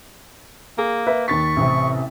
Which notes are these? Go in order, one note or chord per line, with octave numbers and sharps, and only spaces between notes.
A#3 G#4
B4 E5
D#2 C#6 A6 B6
A1 C3